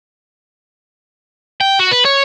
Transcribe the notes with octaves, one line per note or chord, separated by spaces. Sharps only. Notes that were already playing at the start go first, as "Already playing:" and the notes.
G5
F#4
B4
C#5